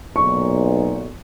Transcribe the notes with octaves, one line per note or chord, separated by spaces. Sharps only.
B1 A#2 C#6